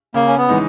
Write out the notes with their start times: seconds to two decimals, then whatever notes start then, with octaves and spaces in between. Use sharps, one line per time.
0.14 C#3 A#3
0.28 C#4
0.38 B3
0.49 E3 G#3 D#4